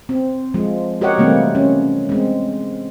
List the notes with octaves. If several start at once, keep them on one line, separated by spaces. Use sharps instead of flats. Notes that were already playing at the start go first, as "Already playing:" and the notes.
C4
F3 G#3
F#4 G4 A#4 C#5 D#5 F#5
C3 E3 G3 A3 A#3 C4
C#4
G#3 C4